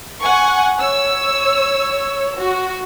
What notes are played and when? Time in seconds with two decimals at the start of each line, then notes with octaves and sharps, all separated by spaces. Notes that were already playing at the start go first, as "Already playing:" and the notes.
0.21 F#5 G#5 C#6
0.80 C#5 E6
2.35 F#4